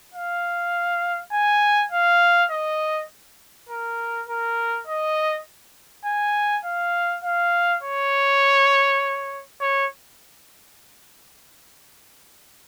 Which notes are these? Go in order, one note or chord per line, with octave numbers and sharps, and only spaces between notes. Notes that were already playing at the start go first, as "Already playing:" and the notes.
F5
G#5
F5
D#5
A#4
A#4
D#5
G#5
F5
F5
C#5
C#5